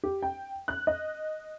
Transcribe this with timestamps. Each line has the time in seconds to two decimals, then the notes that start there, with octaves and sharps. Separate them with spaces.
0.03 G4
0.22 G5
0.68 F#6
0.87 D#5